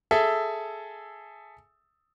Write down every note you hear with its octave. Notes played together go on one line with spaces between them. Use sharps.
G#4 A4 E5